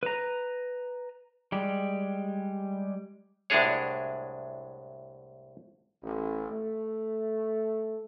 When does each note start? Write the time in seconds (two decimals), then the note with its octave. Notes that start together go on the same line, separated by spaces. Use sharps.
0.03 B4 A#5
1.52 G3 G#3 G4
3.50 C2 A2 G#3 D4 G#4 C#5
6.03 A1
6.51 A3